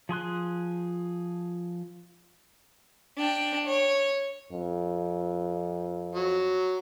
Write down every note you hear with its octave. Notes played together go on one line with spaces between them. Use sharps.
F3 G#4 C6 F#6
D4 G5
C#5
F2
F#3